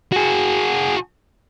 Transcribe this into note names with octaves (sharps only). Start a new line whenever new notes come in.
F#4 G#4